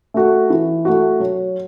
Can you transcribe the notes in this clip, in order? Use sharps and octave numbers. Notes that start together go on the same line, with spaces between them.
A3 F#4
E3
A3 F#4
F#3